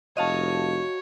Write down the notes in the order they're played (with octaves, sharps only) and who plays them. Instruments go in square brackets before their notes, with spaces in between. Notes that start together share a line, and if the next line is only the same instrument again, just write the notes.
[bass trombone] F1 [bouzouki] F#3 F#4 [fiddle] C#5 [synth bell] D#5 F5 A5